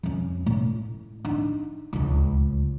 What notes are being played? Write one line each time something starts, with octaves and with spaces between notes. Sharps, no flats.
F2 C#4
A2
D4 D#4
D1 C#2